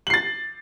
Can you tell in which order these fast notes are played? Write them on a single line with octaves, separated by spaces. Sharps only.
F#7 C7 A6